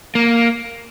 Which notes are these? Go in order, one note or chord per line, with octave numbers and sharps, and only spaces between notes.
A#3